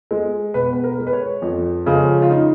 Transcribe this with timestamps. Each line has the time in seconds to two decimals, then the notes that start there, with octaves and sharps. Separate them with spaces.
0.11 G#3
0.54 B2 B4
0.73 B4
0.84 A#4
0.98 G#3
1.07 B4
1.13 C#5
1.42 F2
1.86 C#3 F3 G#3
2.22 F4
2.30 D#4